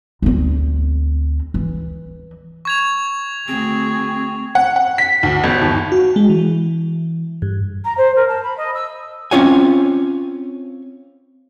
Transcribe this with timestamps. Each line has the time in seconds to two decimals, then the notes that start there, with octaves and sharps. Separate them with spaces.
0.22 D2 C4
1.54 E3
2.65 C#6 G#6 F7
3.48 D2 C4 G#4
4.55 F#5
4.76 F#5
4.98 B6
5.23 D2
5.44 G1
5.62 D#2
5.92 F#4
6.16 G#3
6.29 E3
7.42 G2
7.85 A#5
7.97 C5
8.16 A#4
8.28 A5
8.44 B5
8.57 D#5
8.74 E6
9.31 C4 C#4 F4 C#5 F#5 G#5